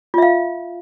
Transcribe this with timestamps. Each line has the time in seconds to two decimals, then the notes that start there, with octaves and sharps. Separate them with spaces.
0.14 F4
0.18 E5
0.22 F5